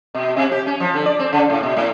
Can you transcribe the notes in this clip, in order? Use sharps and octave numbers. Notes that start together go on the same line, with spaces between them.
B2
C3
G4
C#4
F3
D3
D5
C4
C#3
A2
B2
A2